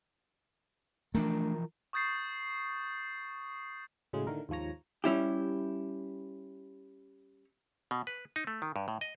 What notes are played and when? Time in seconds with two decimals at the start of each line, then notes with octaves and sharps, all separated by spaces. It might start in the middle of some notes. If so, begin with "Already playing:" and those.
1.15 E3 F3 A3 D4 A#4
1.93 C#6 D#6 G6 A6 C7
4.13 A2 C#3 F#3 G#3
4.27 A2 D3 D#3 A3 A#4
4.49 D#2 G#2 F3 C#5 A#5
5.04 G3 C#4 E4 G4
7.91 B2
8.07 B4
8.36 D#4
8.47 A3
8.62 D#3
8.76 G2
8.88 A2
9.01 D#5